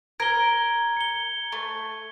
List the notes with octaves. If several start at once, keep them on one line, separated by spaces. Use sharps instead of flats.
A#4 G#6 G7
C#7 G7
A3